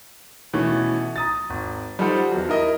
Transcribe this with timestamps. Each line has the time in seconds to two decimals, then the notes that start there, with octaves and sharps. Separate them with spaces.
0.53 B2 E3 A3 C#4 E4
1.16 A#5 D#6 A6
1.50 G#1
1.99 G3 D#4 F4 A4 C5 F#5
2.32 E2 F#3
2.49 E4 A#4 D#5